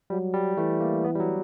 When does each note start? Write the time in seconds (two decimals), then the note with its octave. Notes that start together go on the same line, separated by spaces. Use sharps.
0.10 F#3 G3
0.34 G3
0.57 E3 A3
0.80 A#3
1.04 B3
1.15 G3
1.20 F#3